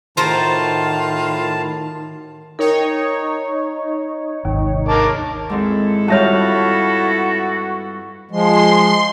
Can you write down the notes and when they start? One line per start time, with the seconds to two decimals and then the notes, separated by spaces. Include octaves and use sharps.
0.17 A2 D#3 F4 F#4 A#4 C5 A5
2.59 D#4 A#4 C#5 G5
4.45 G#1 D#2 C3
4.88 A#4 A5 D6
5.50 G#2 D#3 C4 E4 A4
6.08 G2 F4 F#4 C#5 E5 F5 A5
8.31 F3 G#3 C6